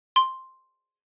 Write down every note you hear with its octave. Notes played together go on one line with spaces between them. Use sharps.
C6